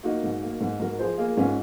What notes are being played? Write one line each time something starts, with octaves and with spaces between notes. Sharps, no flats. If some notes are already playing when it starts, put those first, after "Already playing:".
A#3 D#4 F#4
G#2
A#3
G#2
G#2 F#4 A#4
F3 G#4 C5
A#3 F4 G#4
G#2 C#4 F4